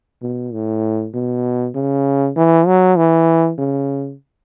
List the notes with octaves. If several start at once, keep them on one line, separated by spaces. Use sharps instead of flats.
B2
A2
B2
C#3
E3
F#3
E3
C#3